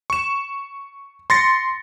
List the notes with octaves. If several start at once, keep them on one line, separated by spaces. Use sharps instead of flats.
C#6 E7
C6 A6 A#6 C#7